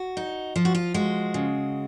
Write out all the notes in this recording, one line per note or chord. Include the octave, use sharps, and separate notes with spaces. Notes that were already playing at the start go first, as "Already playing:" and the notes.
Already playing: F#4
D#4
F3 F4
F#4
F4
G#3 F#4
C#3